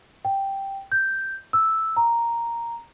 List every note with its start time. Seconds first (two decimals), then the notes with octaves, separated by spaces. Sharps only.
0.25 G5
0.92 G6
1.53 E6
1.97 A#5